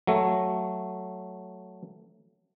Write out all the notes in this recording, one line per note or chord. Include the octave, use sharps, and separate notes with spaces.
F#3 A3